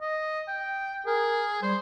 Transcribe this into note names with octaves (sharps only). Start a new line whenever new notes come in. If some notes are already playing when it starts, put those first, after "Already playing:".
D#5
G5
G#4 A#4
G3 C5